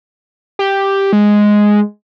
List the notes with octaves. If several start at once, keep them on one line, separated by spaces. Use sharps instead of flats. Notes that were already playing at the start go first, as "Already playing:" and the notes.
G4
G#3